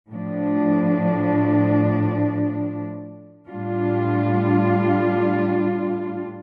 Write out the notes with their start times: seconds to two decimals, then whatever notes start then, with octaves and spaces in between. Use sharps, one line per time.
0.11 A2 F3 D4
3.50 A2 G3 D4 F4